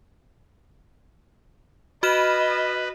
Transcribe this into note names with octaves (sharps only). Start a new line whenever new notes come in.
F#4 B4 D#5 F6 E7